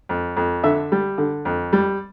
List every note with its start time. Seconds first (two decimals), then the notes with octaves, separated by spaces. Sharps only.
0.09 F2
0.37 F2
0.63 D3 E5
0.92 G3
1.18 D3
1.45 F2
1.73 G3